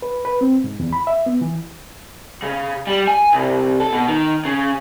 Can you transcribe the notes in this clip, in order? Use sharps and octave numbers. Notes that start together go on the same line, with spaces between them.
B4
B4
C4
G#2
E2
B5
E5
B3
E3
C#3
G3
G#5
C2
A4
B2
D#3
C#3